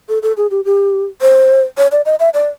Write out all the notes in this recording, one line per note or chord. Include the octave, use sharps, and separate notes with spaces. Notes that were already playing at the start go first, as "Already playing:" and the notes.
A4
A4
G#4
G4
G4
C5
C#5
D5
D#5
E5
D5